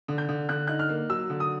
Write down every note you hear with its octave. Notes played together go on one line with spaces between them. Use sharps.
D3
G6
D3
D3 F#6
D#4 F#6
F6
A#3
F#3 E6
D3
D#6